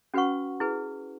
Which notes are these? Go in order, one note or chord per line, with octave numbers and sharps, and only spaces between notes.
C#4 F#4 B4 F#5 C#6
E4 G#4 B4